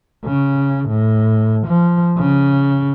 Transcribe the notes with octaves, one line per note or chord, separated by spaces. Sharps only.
C#3
A2
F3
C#3